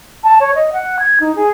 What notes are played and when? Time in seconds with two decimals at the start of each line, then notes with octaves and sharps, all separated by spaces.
0.23 A5
0.40 C#5
0.55 D#5
0.73 F#5
0.99 G#6
1.20 D#4
1.35 G#4